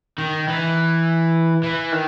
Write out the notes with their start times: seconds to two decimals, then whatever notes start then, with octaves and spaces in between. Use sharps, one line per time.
0.18 D#3
0.48 E3
1.63 E3
1.92 D#3